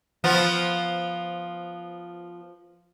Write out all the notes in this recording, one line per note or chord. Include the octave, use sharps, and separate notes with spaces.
F3 B3 F4